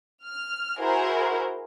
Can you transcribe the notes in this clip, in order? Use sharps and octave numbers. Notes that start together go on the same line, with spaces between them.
F6
E4 F#4 G#4 A#4 C5